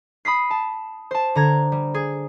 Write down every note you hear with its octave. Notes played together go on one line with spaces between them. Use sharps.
B5 D#6 B6 C7
A5
C5 A5
D3 A#5 G#6
G3
G#4